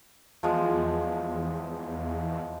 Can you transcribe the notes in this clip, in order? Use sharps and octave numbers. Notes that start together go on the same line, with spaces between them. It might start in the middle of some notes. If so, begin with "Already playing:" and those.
E2 F3 G#3